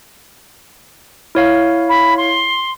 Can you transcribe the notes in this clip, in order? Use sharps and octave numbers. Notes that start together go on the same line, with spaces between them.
E4 C#5 F5
B5
C6